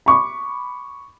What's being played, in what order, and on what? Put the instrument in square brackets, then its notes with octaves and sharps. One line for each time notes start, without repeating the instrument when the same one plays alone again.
[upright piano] B5 C#6 D6